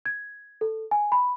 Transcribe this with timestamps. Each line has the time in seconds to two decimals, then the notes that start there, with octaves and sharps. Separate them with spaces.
0.06 G#6
0.61 A4
0.91 G#5
1.12 B5